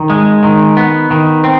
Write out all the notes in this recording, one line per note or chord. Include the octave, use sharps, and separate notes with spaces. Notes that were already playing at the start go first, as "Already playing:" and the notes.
Already playing: D#3
G#3
D#3
B3
D#3
C4